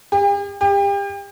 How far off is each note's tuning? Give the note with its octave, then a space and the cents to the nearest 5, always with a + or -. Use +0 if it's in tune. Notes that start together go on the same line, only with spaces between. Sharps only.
G4 +45
G4 +35